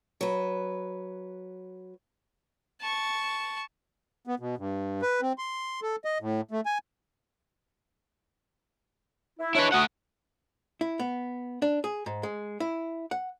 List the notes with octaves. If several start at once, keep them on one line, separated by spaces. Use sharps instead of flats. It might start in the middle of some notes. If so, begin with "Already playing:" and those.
F#3 B4
A5 C#6
B3
B2
G2
B4
C4
C6
A4
D#5
A2
A3
G#5
E4
G#3 D4 E4 B4 C#5
A3 F#4 F#5 D#6
E4
B3
D4
G#4
G#2
G#3
E4
F#5